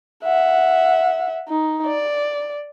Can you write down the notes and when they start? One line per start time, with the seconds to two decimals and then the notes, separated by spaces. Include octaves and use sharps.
0.24 E5 F#5
1.48 D#4
1.87 D5